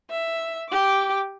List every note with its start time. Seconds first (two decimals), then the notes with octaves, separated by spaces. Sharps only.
0.11 E5
0.69 G4 D6